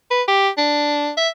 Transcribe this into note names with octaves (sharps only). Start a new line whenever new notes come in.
B4
G4
D4
E5